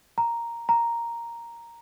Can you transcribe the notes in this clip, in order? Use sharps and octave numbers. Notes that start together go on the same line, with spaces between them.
A#5
A#5